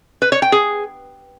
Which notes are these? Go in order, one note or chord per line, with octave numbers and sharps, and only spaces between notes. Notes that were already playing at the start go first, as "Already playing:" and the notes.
B4
C#5
G5
G#4